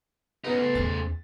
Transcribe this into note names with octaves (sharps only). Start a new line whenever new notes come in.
B3 C#4 D#4
A3 C5
E2 C#4 A6